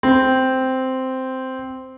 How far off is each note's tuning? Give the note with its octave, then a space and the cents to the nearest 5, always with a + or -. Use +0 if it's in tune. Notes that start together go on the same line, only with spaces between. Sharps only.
C4 -5